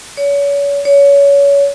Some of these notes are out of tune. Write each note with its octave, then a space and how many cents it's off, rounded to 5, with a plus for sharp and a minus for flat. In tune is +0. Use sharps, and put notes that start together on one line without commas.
C#5 +35
C#5 +25